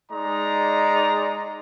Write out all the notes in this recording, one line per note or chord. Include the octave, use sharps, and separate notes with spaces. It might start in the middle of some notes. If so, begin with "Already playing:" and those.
G#3 D#4 D5 A#5